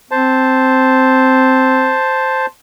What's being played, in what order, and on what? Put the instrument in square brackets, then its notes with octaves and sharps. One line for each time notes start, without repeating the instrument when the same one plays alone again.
[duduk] C4 [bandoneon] C5 A5